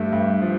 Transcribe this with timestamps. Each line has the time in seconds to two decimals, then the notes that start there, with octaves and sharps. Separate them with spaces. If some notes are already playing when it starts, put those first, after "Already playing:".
Already playing: G2 A3
0.12 G2
0.42 F3